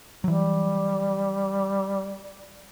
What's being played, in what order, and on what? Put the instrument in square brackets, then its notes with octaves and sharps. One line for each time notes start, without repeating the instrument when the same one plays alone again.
[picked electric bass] E3 F#3 [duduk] G3